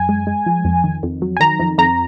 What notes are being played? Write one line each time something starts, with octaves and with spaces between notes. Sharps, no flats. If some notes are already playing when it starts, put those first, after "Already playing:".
Already playing: F#2 G#5
G#3
G#3
F3
F2
D#3
F2
F#3
G#5
D#3 A#5
F2
F2 A#5